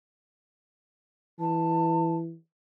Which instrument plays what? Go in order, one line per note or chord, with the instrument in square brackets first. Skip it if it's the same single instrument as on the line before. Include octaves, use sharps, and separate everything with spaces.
[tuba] E3 [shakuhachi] A5